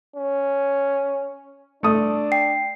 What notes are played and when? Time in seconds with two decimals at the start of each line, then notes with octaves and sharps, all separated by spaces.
0.16 C#4
1.83 A3 D4 D#6
2.32 G5 C7